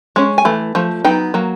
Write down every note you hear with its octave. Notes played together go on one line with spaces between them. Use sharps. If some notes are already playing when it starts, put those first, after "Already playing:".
G#3 C#4
G#5
E3 A3
F3 A3
F#3 B3 D#4 G5
F#3 A#3